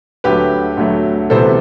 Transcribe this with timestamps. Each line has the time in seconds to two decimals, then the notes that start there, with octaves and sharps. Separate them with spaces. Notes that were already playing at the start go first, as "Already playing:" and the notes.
0.24 D2 D3 F#3 A3 G4 B4
0.77 D2 D3 F#3 A3
1.30 D2 C3 E3 G3 B3 A4 C5